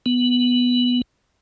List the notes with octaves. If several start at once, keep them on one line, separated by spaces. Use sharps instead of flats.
B3